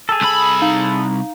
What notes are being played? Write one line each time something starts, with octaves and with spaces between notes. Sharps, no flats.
G#4 A4
C2 B5
D#4 F5 A#5